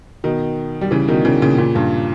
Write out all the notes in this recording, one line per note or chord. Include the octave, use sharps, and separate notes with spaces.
B2 D#3
G3
C#3 E3
B2 D#3
C#3 E3
A#2 C#3
A#2 C#3
G2 A#2